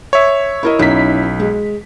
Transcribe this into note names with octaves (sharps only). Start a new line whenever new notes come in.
C#5 E5
E4 A#4 D#5
B1 C#4 D#4 E4 B6
G#3